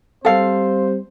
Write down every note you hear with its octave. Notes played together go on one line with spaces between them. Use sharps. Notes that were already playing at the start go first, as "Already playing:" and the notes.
G3 C4 A4 C5 F5